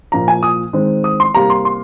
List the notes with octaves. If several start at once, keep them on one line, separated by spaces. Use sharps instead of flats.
A#2 F3 A#3 A#5
G#5
D#6
D#3 G#3 C4
D#6
C6
C3 G3 A#3 A#5
C6
C6